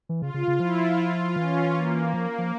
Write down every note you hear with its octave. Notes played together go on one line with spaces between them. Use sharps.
E3
C#3 F4
C#3
C#3
F3 E4
F4
E3 C#4
A#3
F3
F3